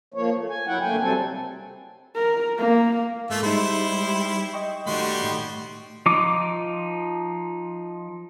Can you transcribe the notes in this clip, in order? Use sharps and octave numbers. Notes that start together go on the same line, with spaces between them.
F3 A#3 C#5
A3
G#5
F2 F#3 E4 F#5 G5
D2 A3 A#3 G5 G#5
C3 F#3 G3 C4 A4 G#5
A#4
A#3
G#2 A3 F4 E5
G3 G#3 D#4 E4 C5
D#5 G5 C#6
D#3 G3 A3 F#4 C6
A2
F3 D#4 D6